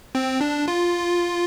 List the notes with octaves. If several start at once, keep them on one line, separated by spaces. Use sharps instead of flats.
C4
D4
F4